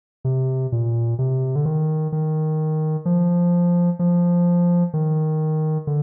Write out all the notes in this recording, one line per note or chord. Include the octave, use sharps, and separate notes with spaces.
C3
A#2
C3
D3
D#3
D#3
F3
F3
D#3
D3